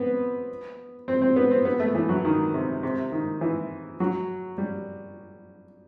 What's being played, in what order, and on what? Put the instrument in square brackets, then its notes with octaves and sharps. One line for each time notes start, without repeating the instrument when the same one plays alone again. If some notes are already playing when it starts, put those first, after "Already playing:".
Already playing: [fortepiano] B3 C4
C4
C4
B3
C4
B3
A3
E3
F#3
D#3
C3
C3
D#3
E3
F#3
G3